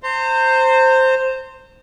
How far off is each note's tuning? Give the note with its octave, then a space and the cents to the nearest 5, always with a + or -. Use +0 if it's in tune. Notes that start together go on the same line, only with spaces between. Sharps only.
C5 +0 A#5 -40